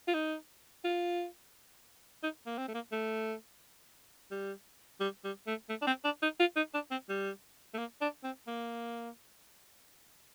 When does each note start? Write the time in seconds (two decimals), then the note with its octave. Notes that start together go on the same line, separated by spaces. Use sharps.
0.08 F4
0.14 D#4
0.84 F4
2.23 D#4
2.46 A#3
2.58 C4
2.68 A3
2.74 A#3
2.92 A3
4.31 G3
5.00 G3
5.24 G3
5.47 A3
5.69 A3
5.82 D4
5.87 C4
6.05 D4
6.23 D#4
6.40 F4
6.56 D#4
6.74 D4
6.91 C4
7.09 G3
7.74 A3
7.78 A#3
8.01 D4
8.24 C4
8.47 A#3